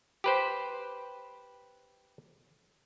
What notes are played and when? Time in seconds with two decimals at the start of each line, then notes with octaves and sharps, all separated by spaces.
0.24 G4 B4 C5